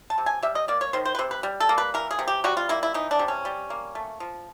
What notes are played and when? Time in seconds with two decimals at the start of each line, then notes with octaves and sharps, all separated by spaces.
0.10 A5
0.18 C3
0.26 G#5
0.43 G3 E5
0.55 D#5
0.68 A#3 D5
0.81 C#5
0.93 D#3 C5
1.05 C5
1.15 B4
1.19 C3 C5
1.31 B4
1.43 G3
1.60 A4
1.69 A#3
1.78 B4
1.94 E3 A#4
2.11 G#4
2.19 C3
2.28 G4
2.44 G3 F#4
2.57 F4
2.69 A#3 E4
2.83 E4
2.94 E3 D#4
3.11 D4
3.19 C3
3.28 C#4
3.45 G3
3.70 A#3
3.95 A3
4.20 F3